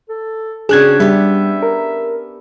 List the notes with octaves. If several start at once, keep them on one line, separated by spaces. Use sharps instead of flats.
A4
C#3 C4 D4 F#4 G#4 F#6 G#6
G3 B3 G4 E5
A#4